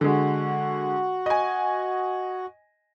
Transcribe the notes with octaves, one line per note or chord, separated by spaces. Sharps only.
D3 G#3 F#4
D#5 G#5